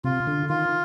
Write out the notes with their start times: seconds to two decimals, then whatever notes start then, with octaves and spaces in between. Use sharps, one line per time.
0.04 C3 F4
0.27 D3
0.49 D#3 F4